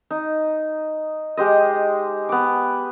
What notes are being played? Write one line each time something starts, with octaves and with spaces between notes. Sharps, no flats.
D#4
G#3 G4 C5 D#5
B3 D6